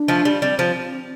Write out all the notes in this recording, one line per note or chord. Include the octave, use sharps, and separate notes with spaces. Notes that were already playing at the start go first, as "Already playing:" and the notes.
Already playing: D4
F3 A3
G3
G3 C4
F3